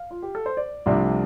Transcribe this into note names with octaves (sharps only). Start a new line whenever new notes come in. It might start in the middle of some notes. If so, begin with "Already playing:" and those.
Already playing: F5
F4
G4
A4
C5
D5
C2 C3 F3 A3 D4